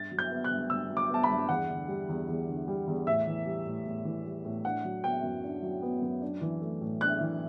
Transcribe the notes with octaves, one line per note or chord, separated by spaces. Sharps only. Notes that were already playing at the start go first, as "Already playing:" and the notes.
Already playing: G2 A6
F#3
G6
B3
F#6
G2
G2 E6
F#3
D6
B3 A5
B5
G2
E2 F#5
D3
G3
E2
E2
D3
G3
E2
A2 E5
E3
G3
A2
A2
E3
G3
A2
D4 F#5
F#3
B3 G5
F#2
D4
F#3
B3
F#2
D4
E3
A3
A2
D4 F#6
E3